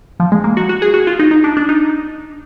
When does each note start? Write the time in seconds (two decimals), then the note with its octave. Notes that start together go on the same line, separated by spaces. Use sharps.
0.20 F3
0.32 G#3
0.44 A#3
0.57 F#4
0.69 F#4
0.82 G#4
0.94 F#4
1.07 F4
1.19 D#4
1.31 D#4
1.44 D4
1.57 D4
1.69 D#4